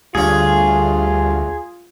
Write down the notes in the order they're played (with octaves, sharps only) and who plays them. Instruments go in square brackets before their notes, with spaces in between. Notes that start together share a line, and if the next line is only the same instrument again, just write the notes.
[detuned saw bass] D2 [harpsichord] G2 C#4 [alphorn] F4 [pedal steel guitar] G#4